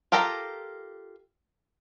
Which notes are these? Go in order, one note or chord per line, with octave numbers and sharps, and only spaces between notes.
F4 G4 A4 A#4 A#5